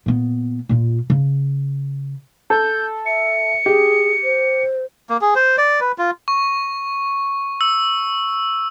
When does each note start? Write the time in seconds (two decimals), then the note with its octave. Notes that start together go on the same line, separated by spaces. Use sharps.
0.06 A#2 B3
0.69 A#2 F4
1.10 C#3
2.50 A4 G6
3.06 E5 C#7
3.66 G4 G#4
4.24 C5
5.10 A#3
5.21 G#4
5.35 C5
5.58 D5
5.80 B4
5.98 F4
6.28 C#6
7.61 E6